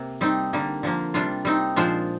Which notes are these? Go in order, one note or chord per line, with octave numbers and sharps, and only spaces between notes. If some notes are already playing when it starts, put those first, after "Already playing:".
Already playing: C3 A#3
G3 C4 D#4
D3 G3 A#3
D3 F3 A#3
C3 G3 D4 F4
G3 C4 D#4
A#2 F3 G#3 D4 F4 C5